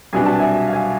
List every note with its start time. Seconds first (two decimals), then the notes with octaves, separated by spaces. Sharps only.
0.13 C2 B2 B3 D4 G#5
0.26 A5
0.39 E5 G#5
0.68 F5
0.73 E5 G#5